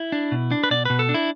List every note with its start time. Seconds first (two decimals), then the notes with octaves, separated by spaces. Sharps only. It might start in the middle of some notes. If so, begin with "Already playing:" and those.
Already playing: E4
0.12 D4
0.32 B2
0.51 D4
0.63 B4
0.71 B2 D5
0.85 B2 B4
0.99 A4
1.09 D4
1.14 E4